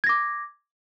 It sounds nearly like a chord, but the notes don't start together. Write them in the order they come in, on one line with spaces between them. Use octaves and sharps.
G#6 A#6 D6